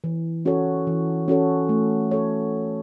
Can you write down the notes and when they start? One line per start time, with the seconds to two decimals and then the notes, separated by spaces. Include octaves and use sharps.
0.04 E3
0.45 C#4 F#4 A4 C#5
0.87 E3
1.28 C#4 F#4 A4 C#5
1.69 A3
2.11 A4 C#5